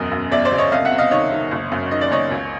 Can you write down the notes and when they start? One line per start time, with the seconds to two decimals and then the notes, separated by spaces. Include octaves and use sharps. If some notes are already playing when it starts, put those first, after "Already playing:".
Already playing: E1 F#2 D#5
0.11 F#2
0.31 G1 D5 E5
0.45 C5 D5
0.52 C#3
0.58 C#5 D#5
0.71 C2 D#5 F5
0.85 E5 F#5
0.91 C3
0.98 D#5 F5
1.11 D#3 C#5 D#5
1.31 D#3
1.51 F#1
1.72 F#2
1.91 D#3 D#5
2.01 D5
2.11 F#1 C#5 D#5
2.31 C#2